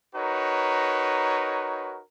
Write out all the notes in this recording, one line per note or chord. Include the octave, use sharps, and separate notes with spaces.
D#4 F#4 A#4 B4 C#5